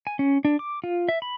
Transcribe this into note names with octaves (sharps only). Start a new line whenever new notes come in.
G#5
C#4
D4
D6
F4
E5
B5